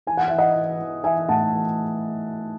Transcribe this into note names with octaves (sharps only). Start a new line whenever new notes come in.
E3 G#5
F#5
E3 E5
D#5 F#5
E3
E3
E3 E5 G#5
A2 F#5 A5
E3